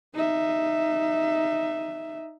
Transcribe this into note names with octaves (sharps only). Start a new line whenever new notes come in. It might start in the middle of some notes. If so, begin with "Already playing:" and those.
D#4 E5